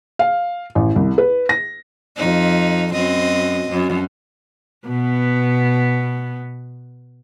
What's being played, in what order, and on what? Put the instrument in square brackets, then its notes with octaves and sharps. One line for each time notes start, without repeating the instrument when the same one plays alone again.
[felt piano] F5
A1
C2
B4
A#6
[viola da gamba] F2 D#4
F#2 C4 D#5
F#2
B2 B3